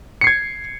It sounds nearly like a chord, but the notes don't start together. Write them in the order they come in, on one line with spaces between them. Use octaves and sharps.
C#7 C7 G#6